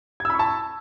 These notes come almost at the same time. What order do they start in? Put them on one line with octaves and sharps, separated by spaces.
G#6 E6 B5 C#6 A5